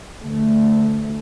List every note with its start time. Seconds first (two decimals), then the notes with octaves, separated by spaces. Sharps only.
0.24 D2 A3